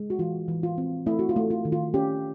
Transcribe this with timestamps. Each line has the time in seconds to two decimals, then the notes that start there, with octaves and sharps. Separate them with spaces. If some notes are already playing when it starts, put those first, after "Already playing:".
Already playing: G#3
0.10 F#4
0.19 E3 F4
0.48 E3
0.63 F4
0.78 C4
1.06 A3 E4
1.19 F#4
1.29 F4
1.36 A3
1.50 F4
1.65 D#3
1.72 F4
1.94 C#4 G4